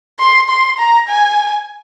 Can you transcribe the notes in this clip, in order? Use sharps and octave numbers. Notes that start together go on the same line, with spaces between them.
C6
C6
A#5
G#5